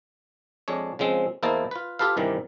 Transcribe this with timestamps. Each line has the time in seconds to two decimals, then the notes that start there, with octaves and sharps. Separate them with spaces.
0.68 F2 G#3 D4 C#5
0.99 C#3 F3 G#3 C4
1.43 E2 A#3 E4 C5 D#5 A5
1.71 F4 B4
1.99 F4 G4 A4 B4 F5
2.17 G2 C3 D#3 E3 G3